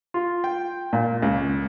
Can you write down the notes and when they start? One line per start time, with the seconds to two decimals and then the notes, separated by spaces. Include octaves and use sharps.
0.14 F4
0.44 G5
0.93 A#2
1.22 C#2